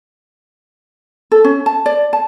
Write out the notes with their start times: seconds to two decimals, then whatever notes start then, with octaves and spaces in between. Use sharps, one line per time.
1.32 A4
1.44 C#4
1.66 A5
1.86 D5
2.13 A5